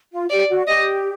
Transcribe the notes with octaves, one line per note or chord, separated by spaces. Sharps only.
F4
G4 D5
F#4
G4 D#5